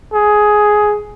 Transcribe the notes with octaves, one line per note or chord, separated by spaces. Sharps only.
G#4